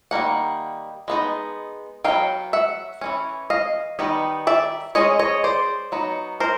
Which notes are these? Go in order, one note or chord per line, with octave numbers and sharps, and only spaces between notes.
D#3 G3 A#3 F#5
G#3 B3 D#4
F#3 B3 D#4 F5 G5
E5 F#5
E3 A3 C#4
D#5 F5
D#3 G3 B3 D#4
D5 E5
G#3 C#4 C#5 D#5
C#5 D#5
C5 D5
F#3 B3 D#4
A#4 C5